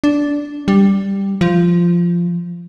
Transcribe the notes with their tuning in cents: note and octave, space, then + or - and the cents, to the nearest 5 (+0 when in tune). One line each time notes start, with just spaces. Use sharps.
D4 -10
G3 +5
F3 -10